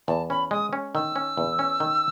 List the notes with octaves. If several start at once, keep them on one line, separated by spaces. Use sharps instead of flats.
E2 A5
C#4 B5
G#3 D#6
C#4
D#3 E6
C#4
E2
C#4
D#3